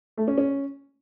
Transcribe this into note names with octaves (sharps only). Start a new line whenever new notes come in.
A3
C#4
C#4